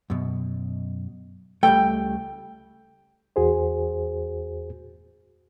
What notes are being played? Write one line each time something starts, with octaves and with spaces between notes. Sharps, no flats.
F#2 B2
C#2 G3 A3 G5
E2 F#4 G#4 C5